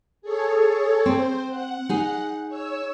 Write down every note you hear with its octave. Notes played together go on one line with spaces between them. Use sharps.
G#4 A4 C#5
C4 C5
F#5
D#4 G#4
C#5 E6